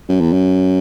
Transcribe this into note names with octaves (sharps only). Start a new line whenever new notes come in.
F#2
E2
F#2